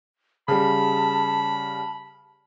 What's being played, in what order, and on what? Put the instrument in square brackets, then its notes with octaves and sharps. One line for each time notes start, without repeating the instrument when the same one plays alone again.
[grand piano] C#3 G3 [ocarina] A5 [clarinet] B5